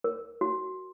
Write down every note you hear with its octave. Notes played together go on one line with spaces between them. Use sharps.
A#4
F#4